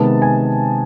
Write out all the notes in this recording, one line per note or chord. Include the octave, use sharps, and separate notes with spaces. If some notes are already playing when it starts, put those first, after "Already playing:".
Already playing: C3 D#3 G#3 B3 A5
G#5